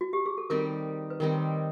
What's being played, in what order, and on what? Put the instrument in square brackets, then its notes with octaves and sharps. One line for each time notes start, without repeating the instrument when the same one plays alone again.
[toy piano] F#4
G4
G#4
A4
[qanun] D#3 G3 C4 D#4 [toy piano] A#4
[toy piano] B4
[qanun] D#3 G3 C4 D#4 [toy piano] A#4